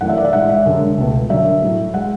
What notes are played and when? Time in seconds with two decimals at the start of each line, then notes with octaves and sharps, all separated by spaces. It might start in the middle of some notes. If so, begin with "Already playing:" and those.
0.01 F#2 E3 A3 F#5
0.10 E5
0.17 D5
0.25 E5
0.33 A2 E3 G#3 F#5
0.49 E5
0.66 F#2 D3 G#3
0.97 C#2 B2 A3
1.29 F#2 D3 F#3 E5
1.62 A2 F#3 A3
1.94 G#3 F#5